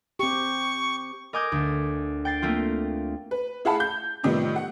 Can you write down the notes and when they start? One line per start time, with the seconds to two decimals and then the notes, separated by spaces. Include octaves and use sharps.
0.19 C4 G4 C#6
1.33 A#4 D#5 G#5 D6 D#6 G6
1.52 D2
2.25 G5 A6 C7
2.42 A3 A#3 C4 F4
3.31 B4
3.65 E4 G#4 F5 F#5 A5 B5
3.80 G6
4.23 A2 C3 D#3 F3 G3 B3
4.56 F#5